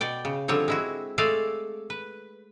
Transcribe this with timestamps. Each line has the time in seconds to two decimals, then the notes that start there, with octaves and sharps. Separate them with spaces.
0.01 B2 D5 G5
0.25 C#3
0.48 D3 F3 G3 C4 C#5
0.68 G#3 E4 F#4
1.18 G#3 A3 A4 D5 D#5 F5
1.90 B4